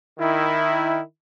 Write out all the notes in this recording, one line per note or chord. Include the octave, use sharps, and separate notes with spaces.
D#3 E4